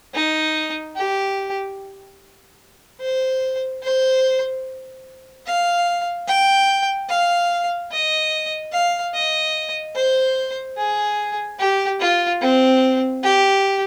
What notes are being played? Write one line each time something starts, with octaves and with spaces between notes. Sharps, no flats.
D#4
G4
C5
C5
F5
G5
F5
D#5
F5
D#5
C5
G#4
G4
F4
C4
G4